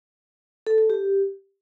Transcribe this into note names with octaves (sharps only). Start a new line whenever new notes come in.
A4
A4
G4